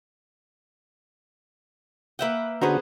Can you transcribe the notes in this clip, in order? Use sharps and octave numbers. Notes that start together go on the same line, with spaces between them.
A#3 B4 E5 F#5 G5
D3 B3 C#4 F#4 G#4 B4 C5 A#5